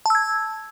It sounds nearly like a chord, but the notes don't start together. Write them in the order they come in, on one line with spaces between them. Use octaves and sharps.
A5 E6 G#6